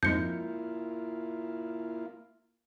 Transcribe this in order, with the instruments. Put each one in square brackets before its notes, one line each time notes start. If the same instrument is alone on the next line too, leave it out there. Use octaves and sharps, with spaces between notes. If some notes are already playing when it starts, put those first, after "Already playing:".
[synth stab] F2 G#2 [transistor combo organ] A#3 E4 F4 [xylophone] G6 C#7